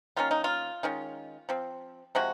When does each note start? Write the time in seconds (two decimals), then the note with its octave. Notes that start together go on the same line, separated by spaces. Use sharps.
0.16 D#3 A#3 C#4 F4
0.31 D#4
0.44 F4
0.83 D#3 G#3 C#4
1.49 F3 C4
2.15 C3 F3 G#3 F#4